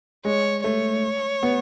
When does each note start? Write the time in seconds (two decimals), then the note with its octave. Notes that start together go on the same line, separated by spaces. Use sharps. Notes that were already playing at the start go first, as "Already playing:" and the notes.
0.25 G#3 C#5
0.64 A3 C#5
1.43 B3